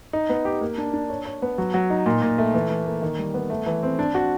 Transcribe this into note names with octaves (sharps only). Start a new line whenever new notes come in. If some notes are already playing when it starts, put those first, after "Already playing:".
D#4
B3
G4
A#3
D4
D4
C#5
C#5
B3
F#3
F#3
D#4
A#2
A#2
A3
E3
E3
A#3
D#3
G3
B3
A3
E3
C4
D4
F#4